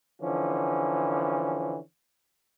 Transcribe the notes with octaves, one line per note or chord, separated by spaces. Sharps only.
D3 E3 F3 C#4